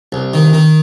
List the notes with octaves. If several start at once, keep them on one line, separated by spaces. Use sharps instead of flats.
C2
D#3
D#3